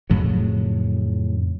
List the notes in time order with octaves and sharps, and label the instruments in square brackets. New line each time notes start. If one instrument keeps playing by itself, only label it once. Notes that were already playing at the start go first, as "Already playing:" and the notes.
[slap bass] F2 A2 C#3 F#3